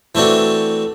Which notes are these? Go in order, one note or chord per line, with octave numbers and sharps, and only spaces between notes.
E3 A3 C4 D4 F#4